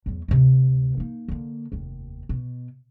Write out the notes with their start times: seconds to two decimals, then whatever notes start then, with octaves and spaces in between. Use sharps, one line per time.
0.06 E2 F#3
0.28 D2 C3
0.97 A#3 D#4
1.28 D3 A#3
1.72 F1 D#2
2.29 B2